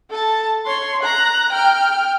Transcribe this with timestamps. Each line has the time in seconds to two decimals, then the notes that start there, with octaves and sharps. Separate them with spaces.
0.10 A4 A5
0.66 C#5 C6
1.03 A#5 F#6
1.52 G5 F6